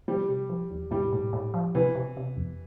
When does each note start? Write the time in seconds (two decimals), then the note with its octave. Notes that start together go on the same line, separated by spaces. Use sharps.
0.08 F3 G3
0.28 C3
0.50 F3
0.70 E2
0.91 A2 G3
1.13 A2
1.33 A2
1.54 F3
1.75 C3 E3
1.95 C3
2.17 C3
2.37 F2